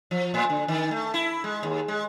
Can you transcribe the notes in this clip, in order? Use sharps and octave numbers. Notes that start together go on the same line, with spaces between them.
F3
A2
D3
D#3
A3
E4
G#3
D#2
G#3